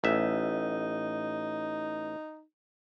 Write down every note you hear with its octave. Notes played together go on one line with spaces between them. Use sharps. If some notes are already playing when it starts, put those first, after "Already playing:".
A1 D#4 E5